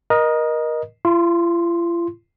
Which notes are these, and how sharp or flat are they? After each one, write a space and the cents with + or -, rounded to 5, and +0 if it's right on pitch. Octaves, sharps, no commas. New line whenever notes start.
A#4 +25 D#5 -5
F4 -45 C6 +0